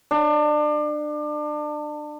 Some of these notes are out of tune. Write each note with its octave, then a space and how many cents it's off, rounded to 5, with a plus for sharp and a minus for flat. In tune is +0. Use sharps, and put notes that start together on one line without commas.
D4 +30